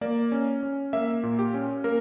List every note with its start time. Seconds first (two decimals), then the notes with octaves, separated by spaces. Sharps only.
0.01 A#3 D5
0.32 C#4
0.63 C#4
0.93 A#3 E5
1.23 A#2
1.39 G4
1.54 C#4
1.84 A#3 A#4